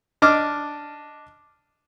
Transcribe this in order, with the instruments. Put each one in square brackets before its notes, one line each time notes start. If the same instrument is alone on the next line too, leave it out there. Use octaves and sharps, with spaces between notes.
[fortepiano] D4 D#5 D6 F6